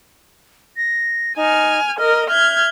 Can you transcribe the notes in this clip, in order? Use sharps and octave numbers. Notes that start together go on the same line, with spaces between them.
A#6
D#4 G#5 F6
A#4 D#5 F6
E5 F6 G6 G#6